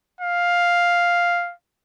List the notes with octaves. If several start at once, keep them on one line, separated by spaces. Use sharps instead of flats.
F5